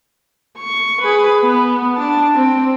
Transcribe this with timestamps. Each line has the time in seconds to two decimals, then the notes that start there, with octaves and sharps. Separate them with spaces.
0.59 C#6
1.01 G#4 B4
1.41 B3
1.97 D4 A5
2.36 C4